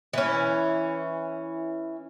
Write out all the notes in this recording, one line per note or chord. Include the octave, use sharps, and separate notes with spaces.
E3 C#4